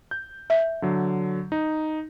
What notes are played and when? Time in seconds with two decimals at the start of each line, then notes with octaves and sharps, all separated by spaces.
0.11 G6
0.50 E5
0.82 D3 F#3
1.52 D#4